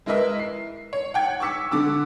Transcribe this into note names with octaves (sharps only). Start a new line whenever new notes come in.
G#3 E4 A#4 B4 D#5 E5
C7
C#5
F#5 G5 G#6
C#6 D6 E6 B6 C#7
D3 D6 E6